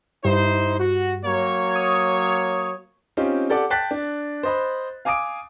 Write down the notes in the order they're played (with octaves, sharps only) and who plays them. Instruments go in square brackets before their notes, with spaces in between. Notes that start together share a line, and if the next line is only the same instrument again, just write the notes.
[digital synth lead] G2 [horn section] D#4 E4 C5
[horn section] F#4
F#3 A#3 C#5
[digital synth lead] D#6
[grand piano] C4 C#4 D#4 F4 G4
G4 A4 D5 F#5 D6
G5 A5 F#6 A6 B6
D4
C5 D#5 B5
F5 G#5 D6 D#6 D7